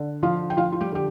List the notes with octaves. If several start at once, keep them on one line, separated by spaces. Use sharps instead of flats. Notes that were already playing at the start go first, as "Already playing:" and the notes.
Already playing: D3
F3 F4 F5
G5
F3 F4 F5
F4
G3 G4
D3 G4